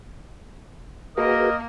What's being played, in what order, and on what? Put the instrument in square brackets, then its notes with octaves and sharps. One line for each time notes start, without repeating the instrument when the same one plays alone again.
[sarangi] A#3 [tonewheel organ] F#4 G#4 B4 [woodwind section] A#4 D#5